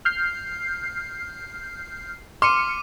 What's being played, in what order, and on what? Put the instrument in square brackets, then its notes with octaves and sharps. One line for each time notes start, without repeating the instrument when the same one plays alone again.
[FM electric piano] F6 G6 C7
[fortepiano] C6 [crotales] D6 D#7 [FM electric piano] F6 C#7